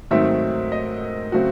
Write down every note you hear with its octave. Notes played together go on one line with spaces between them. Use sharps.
G#2 D#3 F#3 A3 C4 E5
D#5
C#3 F#3 A3 C4 F#4